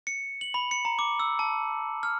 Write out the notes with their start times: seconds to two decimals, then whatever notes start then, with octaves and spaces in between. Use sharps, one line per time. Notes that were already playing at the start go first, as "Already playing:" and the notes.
0.07 C#7
0.41 F#7
0.54 B5
0.71 C#7
0.85 A#5
0.99 D6
1.20 E6
1.39 A5
2.03 F6